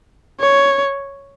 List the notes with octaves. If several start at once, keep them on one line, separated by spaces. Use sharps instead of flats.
C#5